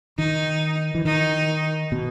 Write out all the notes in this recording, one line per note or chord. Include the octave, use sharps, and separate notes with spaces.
D#3 D#4
E3
D#3 D#4
B2